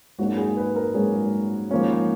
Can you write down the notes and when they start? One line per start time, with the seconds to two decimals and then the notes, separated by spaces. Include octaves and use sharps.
0.18 G#1 G#2 F#3 A#3 C#4 F#4
0.37 G#4
0.57 B4
0.76 A#4
0.95 G#1 G#2 F#3 A#3 C#4 G#4
1.71 G#2 F3 A#3 C#4